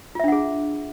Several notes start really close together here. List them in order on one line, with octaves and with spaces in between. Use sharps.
F4 E5 D4 F#5 G#4